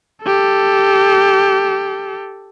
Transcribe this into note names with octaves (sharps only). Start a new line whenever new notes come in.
G4 A4